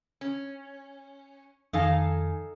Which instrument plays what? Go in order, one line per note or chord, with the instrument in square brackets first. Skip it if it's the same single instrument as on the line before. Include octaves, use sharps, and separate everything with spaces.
[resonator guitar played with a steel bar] C#4
[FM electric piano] F2 D#3 G#5 [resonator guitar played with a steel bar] D#4 A4 F5